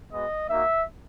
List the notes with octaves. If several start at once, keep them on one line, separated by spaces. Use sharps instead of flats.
G#3 B3 F#4 D#5
A#3 D#4 F#4 E5